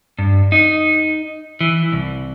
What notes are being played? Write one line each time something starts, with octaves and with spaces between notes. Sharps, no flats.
G2
D#4
E3
C2